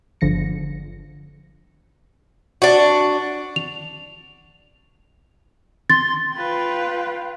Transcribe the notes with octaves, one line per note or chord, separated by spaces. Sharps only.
G1 D3 F3 A#6 C#7
D4 F#4
F7
C6 A6
F4 B4 F5 G5